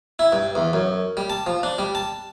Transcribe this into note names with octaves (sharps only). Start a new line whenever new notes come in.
E4
G2
E2
F#2
G3
A5
F3
D4
G3
A5